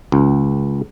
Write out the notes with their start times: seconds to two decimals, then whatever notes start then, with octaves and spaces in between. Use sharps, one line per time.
0.12 C#2